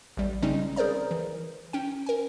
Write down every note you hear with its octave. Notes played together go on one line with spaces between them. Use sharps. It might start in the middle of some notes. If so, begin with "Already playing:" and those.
A1 G3
C#3 G3 G#3 C4 C#4 D#4
G#4 A#4 C5 D5 A#5
E3
C#4 G5
A#4 G#5